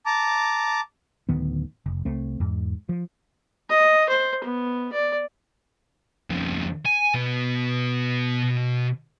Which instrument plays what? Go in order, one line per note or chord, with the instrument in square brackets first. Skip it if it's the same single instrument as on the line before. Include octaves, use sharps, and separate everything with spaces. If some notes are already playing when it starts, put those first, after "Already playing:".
[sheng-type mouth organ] A5 A#5 D6
[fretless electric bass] D1 D2 D#3 B3
F1
C2 A3 C4
E2 G#2
F3
[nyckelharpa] D#5
C5
B3
D5
[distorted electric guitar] F2 C#3
G#5
B2 B3